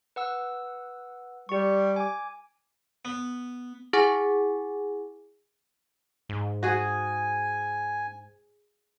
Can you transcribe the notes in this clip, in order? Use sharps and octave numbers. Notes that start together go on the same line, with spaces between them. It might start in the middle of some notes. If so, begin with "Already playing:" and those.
B4 F#5 E6
G3 G4 C#6
G#5 D6
B3
E4 G#4 F#5 G#5 D6 A6
G#2
F#4 G#4 G#5